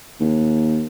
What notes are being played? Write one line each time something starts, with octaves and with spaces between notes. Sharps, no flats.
D#2